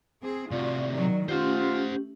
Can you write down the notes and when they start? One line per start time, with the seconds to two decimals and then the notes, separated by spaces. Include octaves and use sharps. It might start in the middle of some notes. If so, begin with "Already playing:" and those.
0.22 C4 G#4
0.51 A2 C3 F4 F#4 D5
0.90 D#3 F#3
1.29 A3 C#4 F4 G4 C5 F#5